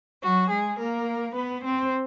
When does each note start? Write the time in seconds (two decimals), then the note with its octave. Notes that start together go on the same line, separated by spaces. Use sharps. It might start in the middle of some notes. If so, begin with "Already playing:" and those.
0.22 F#3 F#4
0.50 G#3 G#4
0.79 A#3 A#4
1.36 B3 B4
1.64 C4 C5